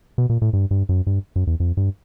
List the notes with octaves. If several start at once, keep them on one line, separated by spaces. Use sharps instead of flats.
B2
A#2
A2
G2
G2
F#2
G2
F#2
E2
F2
G2